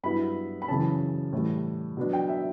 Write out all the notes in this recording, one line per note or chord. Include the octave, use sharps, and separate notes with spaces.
G2 F#3 B3 E4 B5
B5
F#2 C#3 E3 A5
A2 E3 G3
B2 F#3 B3 D4
G5
E5